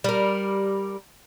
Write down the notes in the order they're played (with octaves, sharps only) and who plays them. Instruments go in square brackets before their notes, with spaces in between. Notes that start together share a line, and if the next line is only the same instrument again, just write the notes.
[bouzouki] G3 A#4